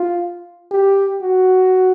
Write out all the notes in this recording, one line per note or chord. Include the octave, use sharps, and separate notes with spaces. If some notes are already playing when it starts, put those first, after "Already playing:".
Already playing: F4
G4
F#4